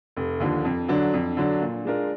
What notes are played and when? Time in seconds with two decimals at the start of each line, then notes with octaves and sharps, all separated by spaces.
0.17 F1
0.40 D#2 D3 F3
0.65 F2
0.89 D3 F#3 D4
1.13 F2
1.37 D3 F#3 D4
1.62 A#2
1.85 G#3 D4 F4 A#4